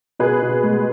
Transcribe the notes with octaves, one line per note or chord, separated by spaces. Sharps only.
B2 G#4 B4
B2
G#3